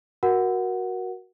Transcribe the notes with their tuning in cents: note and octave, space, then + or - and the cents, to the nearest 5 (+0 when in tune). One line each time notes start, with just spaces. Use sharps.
F#4 +0 A#4 +15 F#5 +0